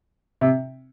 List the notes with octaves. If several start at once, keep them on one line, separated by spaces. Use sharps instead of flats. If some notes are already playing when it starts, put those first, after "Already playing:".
C3